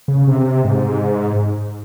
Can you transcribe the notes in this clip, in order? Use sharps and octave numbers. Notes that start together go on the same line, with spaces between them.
C#3
C3
G#2